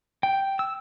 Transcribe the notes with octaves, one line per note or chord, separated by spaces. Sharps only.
G5
E6